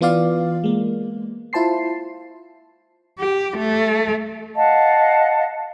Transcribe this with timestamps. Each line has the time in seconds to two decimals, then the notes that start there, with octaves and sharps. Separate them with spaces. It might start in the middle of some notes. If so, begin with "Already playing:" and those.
0.01 E3 B3 F4 D5 F5
0.64 G#3 A#3
1.53 E4 F4 C5 A5 C6 C7
3.19 G4
3.58 A3
4.55 D#5 F5 F#5 A5